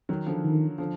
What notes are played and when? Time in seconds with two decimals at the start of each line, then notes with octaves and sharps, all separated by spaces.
0.09 D#3 F#3
0.27 D3 F3
0.44 D#3
0.78 D3 F3